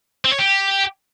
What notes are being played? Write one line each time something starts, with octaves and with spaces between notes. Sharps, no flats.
C4
C#5
G4